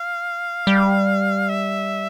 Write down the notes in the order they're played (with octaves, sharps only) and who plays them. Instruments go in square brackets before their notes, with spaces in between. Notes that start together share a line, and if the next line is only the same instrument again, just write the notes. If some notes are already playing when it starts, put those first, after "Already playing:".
Already playing: [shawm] F5
[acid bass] G3
[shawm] E5